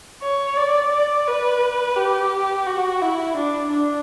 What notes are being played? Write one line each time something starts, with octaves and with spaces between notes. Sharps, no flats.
C#5
D5
D5
B4
G4
F#4
E4
D4
D4